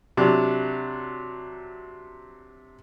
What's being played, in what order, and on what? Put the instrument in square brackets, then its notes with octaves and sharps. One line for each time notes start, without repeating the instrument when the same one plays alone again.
[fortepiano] C3 F#3 D4